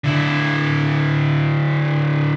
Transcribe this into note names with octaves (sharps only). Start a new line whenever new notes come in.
D3 E4